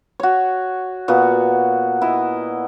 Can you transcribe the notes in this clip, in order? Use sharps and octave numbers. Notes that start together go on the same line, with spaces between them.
F#4 C#5
A#2 B3 F#4
E4 D#5